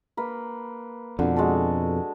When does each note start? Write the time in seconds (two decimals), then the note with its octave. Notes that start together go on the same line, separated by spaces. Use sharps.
0.17 A#3 B4
1.19 F2 B2 D3
1.36 G#3 F#4 A4